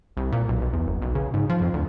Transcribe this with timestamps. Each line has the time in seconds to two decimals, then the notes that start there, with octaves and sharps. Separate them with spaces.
0.17 C2
0.32 A#2
0.49 B1
0.62 B1
0.73 E2
0.87 F#1
1.02 B1
1.15 C#3
1.34 G#2
1.49 F3
1.61 F2
1.74 D2